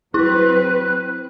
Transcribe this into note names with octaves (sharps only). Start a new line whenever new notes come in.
F#3 C4 E4 B4 F#6